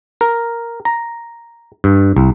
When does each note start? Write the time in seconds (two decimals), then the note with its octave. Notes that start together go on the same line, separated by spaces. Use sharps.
0.21 A#4
0.85 A#5
1.84 G2
2.17 C2